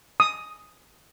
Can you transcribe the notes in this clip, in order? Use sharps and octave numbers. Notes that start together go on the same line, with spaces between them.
D#6